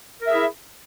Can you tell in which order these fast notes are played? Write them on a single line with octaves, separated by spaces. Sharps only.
A#4 E5 G#4 E4